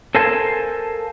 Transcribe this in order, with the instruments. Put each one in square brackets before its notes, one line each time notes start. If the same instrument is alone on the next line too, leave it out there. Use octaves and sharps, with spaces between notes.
[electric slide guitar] A4 A#4 C5 F5 G#5 A5